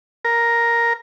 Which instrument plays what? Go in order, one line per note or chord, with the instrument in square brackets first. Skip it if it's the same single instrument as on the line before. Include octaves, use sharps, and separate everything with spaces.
[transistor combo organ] A#4